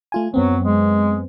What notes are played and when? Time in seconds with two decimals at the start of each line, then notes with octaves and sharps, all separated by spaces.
0.12 A3 F4 G#5
0.34 F#2 F#3 B3 C4
0.65 G#3